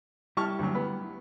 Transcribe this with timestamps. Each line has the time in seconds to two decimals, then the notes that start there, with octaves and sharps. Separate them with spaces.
0.37 G3 E4 G4 A5 C#6 F6
0.59 D2 F#3
0.75 B3